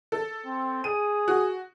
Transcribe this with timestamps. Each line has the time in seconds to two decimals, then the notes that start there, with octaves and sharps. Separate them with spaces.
0.12 A4
0.46 C4
0.84 G#4 D#7
1.28 F#4